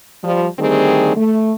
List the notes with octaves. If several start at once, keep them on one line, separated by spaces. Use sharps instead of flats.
F3 G3
D3 D#3 G3 A3 C4 G#4
A3